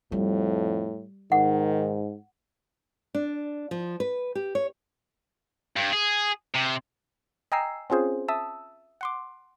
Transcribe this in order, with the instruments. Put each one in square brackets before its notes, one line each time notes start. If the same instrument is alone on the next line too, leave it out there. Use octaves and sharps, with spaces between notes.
[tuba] F2 [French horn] A2 [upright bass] G3
[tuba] G#2 [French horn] D#3 [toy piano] F#5
[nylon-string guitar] D4
F3
B4
G4
C#5
[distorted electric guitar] G2
G#4
C3
[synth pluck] D#5 G5 G#5 A#5 E6 C7
C4 C#4 F4 G#4 C5
E5 A5 D#6 E6
F#5 C6 D6